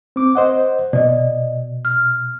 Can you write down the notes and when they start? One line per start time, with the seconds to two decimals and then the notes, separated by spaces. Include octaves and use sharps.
0.16 C4 D6
0.35 C5 D#5 F#5
0.93 B2 D5 D#5
1.85 F6